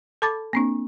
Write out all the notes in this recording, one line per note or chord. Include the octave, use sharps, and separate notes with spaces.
A4 A5 B5 D6 A6
A#3 C4 D4